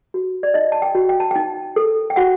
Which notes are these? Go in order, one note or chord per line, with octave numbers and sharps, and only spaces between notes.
F#4
D5
D#4 D#5
A5
G5
F#4
G5
A5
D#4 G5
A4
G5
F#4 F#5